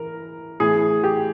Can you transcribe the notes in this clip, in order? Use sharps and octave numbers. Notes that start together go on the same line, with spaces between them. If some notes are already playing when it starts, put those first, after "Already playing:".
Already playing: E3 A#4
A2 E3 G#4
G4